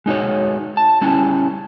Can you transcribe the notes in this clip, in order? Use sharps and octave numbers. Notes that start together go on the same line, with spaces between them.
G#3 D#4 F#4 C#5
A5
G3 C#4 E4 A5